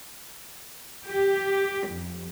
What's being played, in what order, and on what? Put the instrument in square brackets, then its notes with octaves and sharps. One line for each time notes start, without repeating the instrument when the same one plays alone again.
[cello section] G4
F2